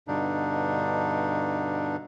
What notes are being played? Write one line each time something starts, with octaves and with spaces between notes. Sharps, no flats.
G2 B2 D3 D4 D#4